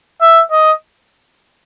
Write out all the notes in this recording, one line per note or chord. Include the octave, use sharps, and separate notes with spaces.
E5
D#5